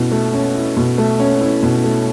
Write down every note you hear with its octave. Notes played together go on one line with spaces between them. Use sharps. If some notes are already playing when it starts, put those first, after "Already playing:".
Already playing: B2 A3 C#4 E4
A3
C#4
E4
B2
A3
C#4
E4
B2
A3